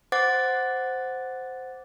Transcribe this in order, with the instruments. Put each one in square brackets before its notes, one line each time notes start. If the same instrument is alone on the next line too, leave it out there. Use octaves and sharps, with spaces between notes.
[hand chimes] C5 F#5 D6 A6